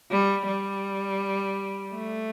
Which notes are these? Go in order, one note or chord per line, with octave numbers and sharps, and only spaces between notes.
G3
G3
A3